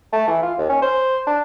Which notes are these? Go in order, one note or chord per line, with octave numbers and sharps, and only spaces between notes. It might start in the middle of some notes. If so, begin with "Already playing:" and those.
A3
E3
F4
D#2
C#4
C5
D4